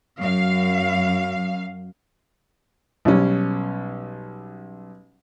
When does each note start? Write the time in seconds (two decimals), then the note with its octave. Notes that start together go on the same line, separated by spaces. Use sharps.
0.19 F#2 F5
3.05 B1 G3 C#4